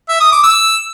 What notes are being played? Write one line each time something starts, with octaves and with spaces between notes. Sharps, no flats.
E5
D#6
D6
E6